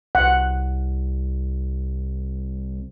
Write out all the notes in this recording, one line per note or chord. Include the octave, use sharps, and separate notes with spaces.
C2 F#5